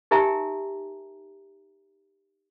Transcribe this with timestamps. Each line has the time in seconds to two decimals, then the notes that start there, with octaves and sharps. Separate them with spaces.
0.11 D#4 G4 A#4 E5 G#5 A#5